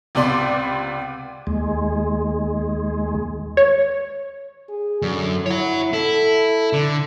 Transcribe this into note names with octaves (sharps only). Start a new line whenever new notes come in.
C#2 C3 B3 D5 C6 D6
D#2 G#3
C#5
G#4
F#2 D3
E4 C#5 F#5
E4 A4
D3